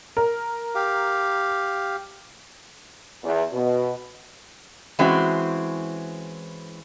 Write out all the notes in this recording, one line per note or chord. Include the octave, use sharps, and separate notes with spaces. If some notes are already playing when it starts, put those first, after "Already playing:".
A#4
G4 F5
E2
B2
E3 G#3 C4 C#4 F#4